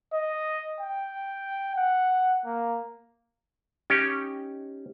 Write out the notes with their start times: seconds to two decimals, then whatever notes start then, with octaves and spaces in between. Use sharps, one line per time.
0.13 D#5
0.81 G5
1.76 F#5
2.45 A#3
3.90 C#4 D#4 G4